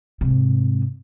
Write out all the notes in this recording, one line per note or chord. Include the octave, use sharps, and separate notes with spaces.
G#2 C3